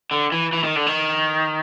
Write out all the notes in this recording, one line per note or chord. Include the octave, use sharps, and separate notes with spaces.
D3
E3
E3
D#3
D3
D#3